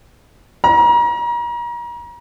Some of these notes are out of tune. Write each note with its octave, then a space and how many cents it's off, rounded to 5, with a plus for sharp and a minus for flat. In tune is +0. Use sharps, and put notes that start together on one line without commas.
A#5 +35